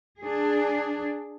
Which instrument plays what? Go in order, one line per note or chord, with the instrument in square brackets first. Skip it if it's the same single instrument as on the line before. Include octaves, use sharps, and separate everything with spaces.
[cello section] D4 G#4